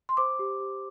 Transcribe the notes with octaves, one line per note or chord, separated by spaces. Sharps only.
C6
C5 D6
G4
G4